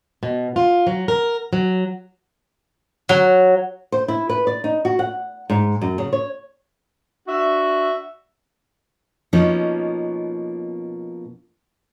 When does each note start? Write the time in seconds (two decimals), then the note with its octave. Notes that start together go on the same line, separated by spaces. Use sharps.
0.23 B2
0.56 F4
0.87 F#3
1.08 A#4
1.53 F#3
3.09 F#3
3.92 C5
4.08 E4
4.29 B4
4.47 D5
4.64 D#4
4.85 F#4
4.99 F#5
5.50 G#2
5.81 F#2
5.98 C#3
6.13 C#5
7.28 D4 F#4 E5
9.33 B2 F3 A#3 B3 C#4 D#4